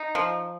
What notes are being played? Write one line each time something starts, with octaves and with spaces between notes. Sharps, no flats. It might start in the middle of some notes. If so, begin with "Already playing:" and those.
Already playing: D#4
F3